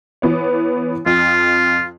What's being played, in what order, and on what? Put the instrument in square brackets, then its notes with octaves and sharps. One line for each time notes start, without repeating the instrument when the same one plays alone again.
[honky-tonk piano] E3 B3 C#5
[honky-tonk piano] F2 [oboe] F4